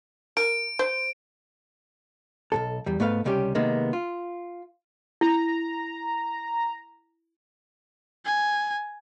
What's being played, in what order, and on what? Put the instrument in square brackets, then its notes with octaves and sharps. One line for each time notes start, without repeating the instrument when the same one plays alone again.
[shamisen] A#4 [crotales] D7
[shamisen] C5
[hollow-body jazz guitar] B1 G2 A4
E2 G3
G#2 A3 B3 B4 F5
C#2 C3 G3 C#4 G4
C3 D#3 G#3 A#3 B3
F4
[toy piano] E4 [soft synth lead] A#5
[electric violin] G#5